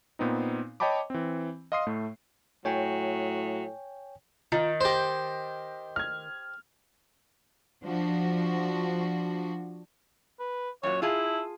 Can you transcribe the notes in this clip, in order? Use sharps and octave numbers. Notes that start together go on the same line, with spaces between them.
A#2 B3 C4 D#4
C#5 D#5 G5 A5 B5 D6
E3 C4
D#5 F5 C6 D#6 C7
A2 A3
A2 F#3 C#5 G5 G#5
D#3 F4 A#5 A6
G4 C5 G6 A#6
F6 G#6
F3 D4 F#4
B4
F#2 A#2 F#3 C#5
E4 F4 G#4 A5